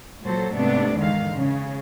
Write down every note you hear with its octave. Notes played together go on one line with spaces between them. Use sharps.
A#2 F#3 A4 C5
G#2 C3 A3 B3 D4
E2 G#2 D3 D#3 G#3 F5
C#3